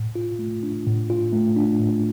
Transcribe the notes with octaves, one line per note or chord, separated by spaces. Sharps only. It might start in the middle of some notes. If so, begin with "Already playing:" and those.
Already playing: A2
F4
A3
D4
A2
F4
A3
D4
A2